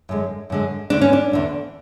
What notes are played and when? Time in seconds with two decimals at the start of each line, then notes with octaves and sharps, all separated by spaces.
0.09 F#2 D3 G#3
0.50 F#2 D3 G#3
0.90 E2 D3 A3 D4
1.01 C#4
1.13 D4
1.32 E2 D3 A3